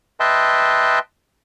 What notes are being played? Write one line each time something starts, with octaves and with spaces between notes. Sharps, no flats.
B4 D#5 E5 G5 A5 C6